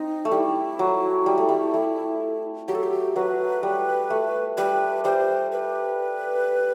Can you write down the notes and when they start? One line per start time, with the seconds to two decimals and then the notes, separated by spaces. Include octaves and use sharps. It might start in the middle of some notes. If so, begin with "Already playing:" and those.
Already playing: C4 D#4
0.25 A3
0.31 G3 E4
0.79 F#3
1.26 G3
1.38 A3
1.49 G3
1.74 A3
2.68 F#3 G4
2.75 A4
2.83 G4
3.16 F#3 B4
3.63 G3
4.10 A3
4.57 G3 B4
5.05 G3 C5
5.52 B4